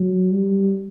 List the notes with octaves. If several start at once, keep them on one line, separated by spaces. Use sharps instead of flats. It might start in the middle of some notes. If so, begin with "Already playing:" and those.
Already playing: F#3
G3